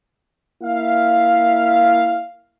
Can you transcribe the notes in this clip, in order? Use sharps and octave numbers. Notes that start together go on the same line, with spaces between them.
A#3 E4 E5 F5